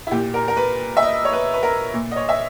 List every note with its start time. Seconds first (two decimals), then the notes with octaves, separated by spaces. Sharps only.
0.07 E4
0.11 A#2 G4
0.34 A#4
0.48 A#4
0.57 B4
0.97 E5
1.03 D#5
1.25 C#5
1.33 B4
1.53 B4
1.63 A#4
1.94 A#2
2.11 D#5
2.16 C#5
2.29 E5